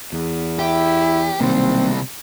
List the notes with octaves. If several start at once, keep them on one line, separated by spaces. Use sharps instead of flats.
E2
E4 G4
B1 C3 D#3 G3 A#3 C4